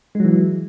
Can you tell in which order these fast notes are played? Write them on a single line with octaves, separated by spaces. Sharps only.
G#3 F#3 E3